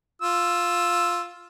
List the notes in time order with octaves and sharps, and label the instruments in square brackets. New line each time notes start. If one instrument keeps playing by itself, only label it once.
[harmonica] F4 E6